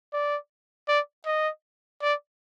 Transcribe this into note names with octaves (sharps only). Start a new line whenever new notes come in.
D5
D5
D#5
D5